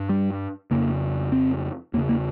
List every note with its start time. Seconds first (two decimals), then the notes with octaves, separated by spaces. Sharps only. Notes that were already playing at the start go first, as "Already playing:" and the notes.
Already playing: G2
0.09 G3
0.71 F2 C#3 A#3
1.32 C4
1.93 E2 A#3
1.97 C#3
2.09 A#3